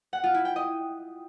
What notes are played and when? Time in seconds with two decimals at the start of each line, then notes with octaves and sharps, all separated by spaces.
0.13 F#5
0.24 F4
0.34 E4
0.45 G5
0.56 D#5